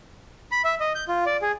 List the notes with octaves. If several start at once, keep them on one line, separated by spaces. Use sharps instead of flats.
B5
E5
D#5
G6
F4
D5
G#4